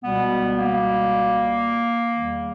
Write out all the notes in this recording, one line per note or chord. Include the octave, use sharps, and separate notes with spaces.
C#2 B2 G3 B3
A#3
E2 D#3 G3